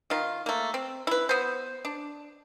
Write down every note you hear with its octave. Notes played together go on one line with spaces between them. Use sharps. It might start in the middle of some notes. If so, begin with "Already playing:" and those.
D#3 F4
A3 A#3
C4
E4 B4
B3 C5
D4